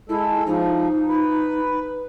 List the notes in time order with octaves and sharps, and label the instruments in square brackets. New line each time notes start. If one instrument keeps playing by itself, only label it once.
[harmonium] G#3 A4 [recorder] E4
[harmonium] F3 [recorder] D#4
[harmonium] B4